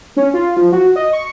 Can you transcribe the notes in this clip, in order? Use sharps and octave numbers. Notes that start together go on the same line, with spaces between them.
C#4
F4
F3
F#4
D#5
C#6